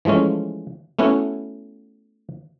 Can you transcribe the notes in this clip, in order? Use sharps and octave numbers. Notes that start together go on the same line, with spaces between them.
E3 F3 G#3 A3 C#4
A3 B3 C#4 E4 F#4